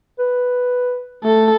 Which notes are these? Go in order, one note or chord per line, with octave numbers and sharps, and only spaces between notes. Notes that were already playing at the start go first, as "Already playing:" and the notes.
B4
A3 A4